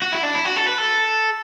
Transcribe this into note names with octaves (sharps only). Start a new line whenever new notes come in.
F#4
E4
D4
E4
F#4
A4
B4
A4